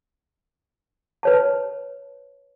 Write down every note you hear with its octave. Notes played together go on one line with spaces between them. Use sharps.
B4 C#5 A5